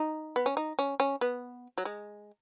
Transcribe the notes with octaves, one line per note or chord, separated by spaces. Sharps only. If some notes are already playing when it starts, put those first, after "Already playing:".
Already playing: D#4
B3
C#4
D#4
C#4
C#4
B3
F#3
G#3